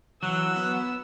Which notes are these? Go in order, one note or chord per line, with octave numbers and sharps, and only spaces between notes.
E3 F#3 F#5 E6
B3